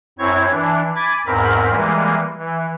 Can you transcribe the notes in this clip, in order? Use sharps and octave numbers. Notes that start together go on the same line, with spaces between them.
F#2 C4 E4 C#5 G#6
E3 D4
G#5 B5 D6 G#6 A6
E2 G#2 C4 A#4 B5
E3 G3 G#3 A#3
E3